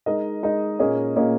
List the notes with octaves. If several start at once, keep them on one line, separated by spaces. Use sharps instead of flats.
G#3 D#4 A#4 D#5
G#3 D#4 A#4 D#5
A#2 A#3 C#4 G#4 D#5
A#2 A#3 C#4 G#4 D#5